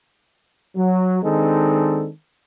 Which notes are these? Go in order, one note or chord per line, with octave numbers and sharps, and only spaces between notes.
F#3
D#3 G#3 C4 D4 D#4 A4